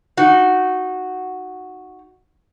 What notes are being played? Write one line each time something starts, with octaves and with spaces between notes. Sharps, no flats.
D#4 F#4